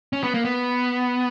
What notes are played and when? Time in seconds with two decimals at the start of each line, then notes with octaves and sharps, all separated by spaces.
0.13 C#4
0.24 B3
0.34 A#3
0.45 B3